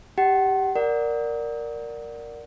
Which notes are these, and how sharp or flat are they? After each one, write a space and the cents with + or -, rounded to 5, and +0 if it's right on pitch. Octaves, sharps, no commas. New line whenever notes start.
G4 +0 F#5 +35
A#4 +0 D5 +0 F#5 +0